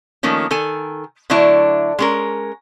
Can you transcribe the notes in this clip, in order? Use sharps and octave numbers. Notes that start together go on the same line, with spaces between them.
D#3 F3 A3 A#3 C#4
D#3 A4 G#5
D3 F#3 A3 D4 E4
G#3 C#4 A#4